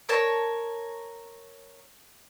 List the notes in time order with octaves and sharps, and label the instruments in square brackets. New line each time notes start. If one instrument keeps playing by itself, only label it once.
[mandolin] A#4 C#5 A5